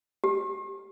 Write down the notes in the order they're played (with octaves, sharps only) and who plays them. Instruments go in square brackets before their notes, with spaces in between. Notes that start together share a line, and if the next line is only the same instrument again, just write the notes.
[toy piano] G4